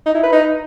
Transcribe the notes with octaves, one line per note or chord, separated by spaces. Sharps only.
D#4
E4
B4
D#4